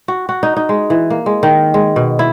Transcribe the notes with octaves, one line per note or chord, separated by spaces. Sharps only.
F#4
F#4
D#4
D#4
G#3
E3
A#3
G#3
D#3
G#3
B2
E4